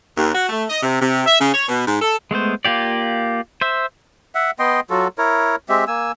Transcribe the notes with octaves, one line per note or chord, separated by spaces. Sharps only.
D#2
F#4
A3
D#5
C3
C3
E5
C#3
C#5
B2
G#2
A4
G#3 A3 B3 C5
A#3 F4 G4 D5
C5 E5
E5 F#5
B3 D#5 G5 C6
F#3 F4 F#4 A4
E4 A#4 C#5
G#3 C4 G4 E5
A#3 G#5 E6